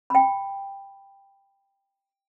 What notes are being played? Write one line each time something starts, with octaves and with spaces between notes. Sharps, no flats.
G5 B5